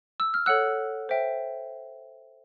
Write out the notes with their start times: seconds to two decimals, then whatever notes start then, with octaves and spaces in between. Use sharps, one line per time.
0.20 E6
0.34 F6
0.46 A4 C#5 F#5 E6 F#6
1.09 C5 E5 G5